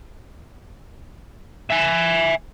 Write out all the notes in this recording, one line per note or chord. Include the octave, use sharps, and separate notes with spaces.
E5 G#5